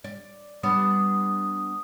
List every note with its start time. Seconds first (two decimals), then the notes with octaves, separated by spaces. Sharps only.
0.04 D5
0.63 G3 B3 D4 D#6